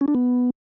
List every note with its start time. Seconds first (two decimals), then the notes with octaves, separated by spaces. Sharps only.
0.01 C#4
0.08 D4
0.15 B3